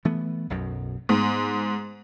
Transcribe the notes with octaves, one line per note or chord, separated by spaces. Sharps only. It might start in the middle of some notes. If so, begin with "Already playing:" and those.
E3 A3 B3
B1 F#2 B2
G#2 B3